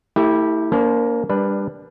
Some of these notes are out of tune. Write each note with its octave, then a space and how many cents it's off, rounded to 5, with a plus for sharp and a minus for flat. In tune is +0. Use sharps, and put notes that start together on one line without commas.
A3 +35 E4 -20 G4 +0
A#3 +5 D4 -40 C5 -10
G3 +20 D4 +0 B4 +0